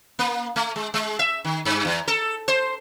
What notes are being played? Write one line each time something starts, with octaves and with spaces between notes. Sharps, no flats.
A#3
A3
G#3
G#3
E5
D#3
G2
E2
A4
C5